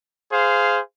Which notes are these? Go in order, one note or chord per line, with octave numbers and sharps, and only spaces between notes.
G#4 C5 F5